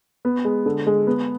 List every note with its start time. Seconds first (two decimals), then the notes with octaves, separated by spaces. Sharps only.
0.25 B3
0.45 G#3
0.66 D3
0.87 G#3
1.07 B3